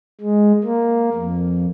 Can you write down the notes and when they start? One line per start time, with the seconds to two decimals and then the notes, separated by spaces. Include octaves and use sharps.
0.21 G#3
0.64 A#3
1.14 F2